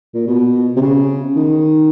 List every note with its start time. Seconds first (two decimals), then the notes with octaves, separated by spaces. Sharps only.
0.14 A#2
0.27 B2
0.76 C3
0.82 C#3
1.36 D#3